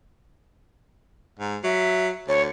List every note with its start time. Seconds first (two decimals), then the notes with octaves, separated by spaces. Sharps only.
1.40 G#2
1.64 F#3 E5
2.28 D2 C#5